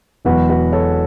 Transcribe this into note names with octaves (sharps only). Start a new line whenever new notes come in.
E1 E2 B2 F#3 F#4 B4
F#4 B4
A4 C#5